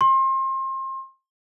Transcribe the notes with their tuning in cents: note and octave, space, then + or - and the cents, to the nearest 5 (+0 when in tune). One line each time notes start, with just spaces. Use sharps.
C6 +30